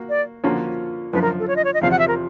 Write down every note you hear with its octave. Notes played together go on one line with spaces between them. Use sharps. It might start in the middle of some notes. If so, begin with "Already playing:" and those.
Already playing: A#3 F#4
D5
D3 F3 A#3 C#4 F#4
F#2 D3 F3 B4
A#4
A4
C#5
D#5
C#5
D#5
E2 C3 F3 F5
F#5
E5
A#4